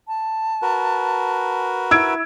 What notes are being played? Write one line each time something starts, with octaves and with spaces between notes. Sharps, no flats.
A5
F#4 A#4 B4
E4 E6 G#6 D7